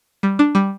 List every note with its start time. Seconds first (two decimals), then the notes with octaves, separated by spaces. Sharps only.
0.23 G3
0.39 D4
0.55 G3